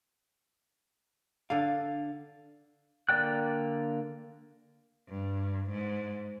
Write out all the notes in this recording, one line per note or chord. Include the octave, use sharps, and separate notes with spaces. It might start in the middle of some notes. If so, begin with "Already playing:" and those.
D3 D5 F5
D3 A#3 D5 G5 F#6
G2
G#2